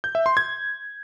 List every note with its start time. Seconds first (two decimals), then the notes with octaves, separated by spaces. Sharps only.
0.04 G6
0.15 E5
0.26 C6
0.37 G#6